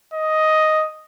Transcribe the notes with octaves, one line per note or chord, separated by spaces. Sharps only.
D#5